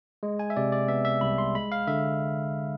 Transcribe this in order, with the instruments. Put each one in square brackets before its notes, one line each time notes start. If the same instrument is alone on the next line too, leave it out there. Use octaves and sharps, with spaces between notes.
[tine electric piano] G#3
G#5
E5
C3 D5
D5
B3 E5
E5
C2 B5
C6
G#3 B5
F5
D3 E5